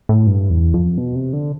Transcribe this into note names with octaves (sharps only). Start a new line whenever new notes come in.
A2
G2
E2
F2
B2
C3
D3